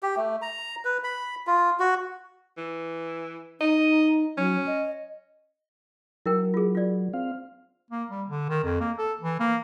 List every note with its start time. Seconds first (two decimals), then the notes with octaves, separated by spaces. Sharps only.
0.03 G4
0.16 A3
0.42 A#5
0.85 B4
1.04 B5
1.47 F4
1.80 F#4
2.58 E3
3.61 D#4 D#5
4.38 F#3 C#4
4.67 D#5
6.26 F#3 E4 A#4 G5
6.54 F4 G#4
6.75 F4 D5
7.14 C4 F5
7.91 A#3
8.10 G3
8.29 D3
8.49 D#3
8.64 F2
8.80 A#3
8.98 A4
9.21 E3
9.40 A#3